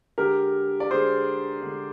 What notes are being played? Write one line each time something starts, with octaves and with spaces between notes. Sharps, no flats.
D3 G#3 G4 A#4
D5
D3 G#3 G#4 C5
D3 G#3